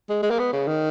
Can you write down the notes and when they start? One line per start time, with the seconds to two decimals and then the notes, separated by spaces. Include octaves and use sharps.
0.09 G#3
0.23 G#3
0.30 A#3
0.39 B3
0.53 C#3
0.68 D#3